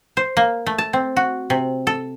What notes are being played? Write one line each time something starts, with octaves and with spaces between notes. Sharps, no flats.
C5
A#3
A3
A5
C4
F#4
C3
A4